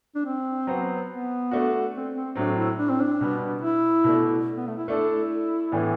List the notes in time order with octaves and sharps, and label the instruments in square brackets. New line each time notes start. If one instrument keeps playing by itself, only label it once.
[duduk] D4
C4
[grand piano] F#3 B3 F#4 C5
[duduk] B3
[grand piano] A3 D4 F#4
[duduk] C4
C4
[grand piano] A2 F#3 C4 [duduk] D4
[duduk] E4
D4
C4
D4
[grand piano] B2 G3 B3
[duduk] E4
[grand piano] B2 A3 D4
[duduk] B3
A3
E4
[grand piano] A3 D4 A4 [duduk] E4
[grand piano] A2 E3 B3 D4